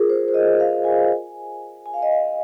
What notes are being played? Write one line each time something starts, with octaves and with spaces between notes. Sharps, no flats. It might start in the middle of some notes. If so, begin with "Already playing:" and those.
Already playing: F4 G#4 A#4
C5
C5
D#5
F5
G#5
G#5
F5
D#5
F5